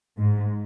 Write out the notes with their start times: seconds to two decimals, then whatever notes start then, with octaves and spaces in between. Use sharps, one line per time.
0.18 G#2